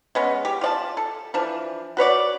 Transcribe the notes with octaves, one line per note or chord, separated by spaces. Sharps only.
G#3 B3 C#4
G4
F4 D5 A5
A4
E3 F3 D4
F#4 B4 C#5 D5